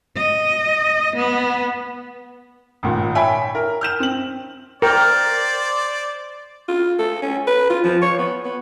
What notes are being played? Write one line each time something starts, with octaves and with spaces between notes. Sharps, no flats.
D#5
B3
G#1 A#2
C#5 E5 G5 G#5 B5
A#4
F6 G6 E7
C4 F#7
A#4 C5 D5 G5
F4
A4
C#4
B4
F4
F3
C#5
B3
B3